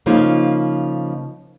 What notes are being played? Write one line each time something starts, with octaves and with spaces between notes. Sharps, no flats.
C#3 F3 A#3 D#4 F4